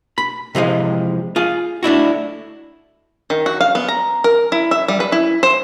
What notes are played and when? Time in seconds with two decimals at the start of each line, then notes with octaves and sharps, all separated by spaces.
0.18 B5
0.55 C3 E3 F3 G#3
1.36 F4 G#4
1.83 A3 D4 E4 F#4
3.30 D#3
3.46 F#4
3.61 F5
3.75 B3
3.88 A#5
4.24 A#4
4.52 E4
4.71 E5
4.88 G3
5.00 B4
5.12 E4
5.43 C5